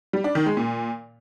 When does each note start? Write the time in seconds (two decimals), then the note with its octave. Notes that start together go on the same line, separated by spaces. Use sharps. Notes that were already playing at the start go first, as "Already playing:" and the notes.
0.13 G3
0.24 D4
0.35 D#3
0.46 G#3
0.57 A#2